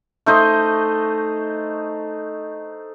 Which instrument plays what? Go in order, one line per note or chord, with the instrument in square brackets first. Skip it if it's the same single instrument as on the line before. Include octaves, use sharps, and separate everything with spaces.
[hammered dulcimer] A3 D#4 C5 D#5